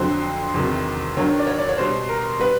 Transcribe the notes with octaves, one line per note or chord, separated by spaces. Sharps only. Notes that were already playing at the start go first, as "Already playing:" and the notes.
Already playing: F2 D3 F#3 C5
E2 C3 D#3 F#3
G2 D#3 F#3 C#5
D5
C#5
D5
C#5
B2 G3 C5
A#4
G3 B4